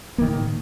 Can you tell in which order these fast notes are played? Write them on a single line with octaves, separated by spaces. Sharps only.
A#3 D#3 D3 A2